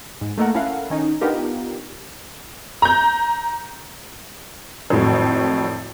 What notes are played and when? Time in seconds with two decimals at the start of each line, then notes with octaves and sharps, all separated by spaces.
0.21 G#2
0.38 A3 A#3 D#4 A4 A#4 F#5
0.54 C#4 E4 A4 A#4 F5 F#5
0.90 D#3 C#4 D#4
1.21 B3 D4 D#4 F4 G4 A#4
2.82 A#5 G6
4.90 G#1 F2 A2 F#3